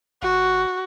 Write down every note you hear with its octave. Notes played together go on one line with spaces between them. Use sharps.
G#1 F#4